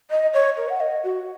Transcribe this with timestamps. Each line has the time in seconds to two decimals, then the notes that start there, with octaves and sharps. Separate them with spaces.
0.11 D#5
0.34 C#5
0.57 A#4
0.69 F#5
0.80 D#5
1.04 F#4